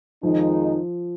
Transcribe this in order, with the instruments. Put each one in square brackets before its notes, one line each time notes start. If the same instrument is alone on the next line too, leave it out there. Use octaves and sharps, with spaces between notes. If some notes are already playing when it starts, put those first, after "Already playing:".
[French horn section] F2 D#3 G#3 D#4 [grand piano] F3